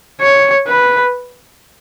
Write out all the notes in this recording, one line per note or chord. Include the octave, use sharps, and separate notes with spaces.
C#5
B4